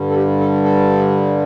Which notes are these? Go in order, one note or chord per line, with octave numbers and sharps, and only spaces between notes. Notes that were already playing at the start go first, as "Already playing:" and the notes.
Already playing: G2 D3 G3
A4
G4
A4
A4